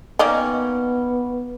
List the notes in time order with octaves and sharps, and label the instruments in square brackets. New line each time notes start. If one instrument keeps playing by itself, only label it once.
[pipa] D#3 A#3 C#4 [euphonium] B3 [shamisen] D5 D#5 G5